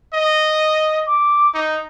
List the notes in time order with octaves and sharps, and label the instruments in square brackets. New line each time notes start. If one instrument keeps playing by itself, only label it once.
[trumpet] D#5
[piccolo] D6
[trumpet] D#4